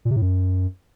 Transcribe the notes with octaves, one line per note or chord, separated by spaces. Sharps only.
A#2
C3
A2
F#2